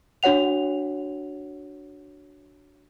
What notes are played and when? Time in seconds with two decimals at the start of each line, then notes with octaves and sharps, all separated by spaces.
0.23 D4 F#4 C#5 F#5 F7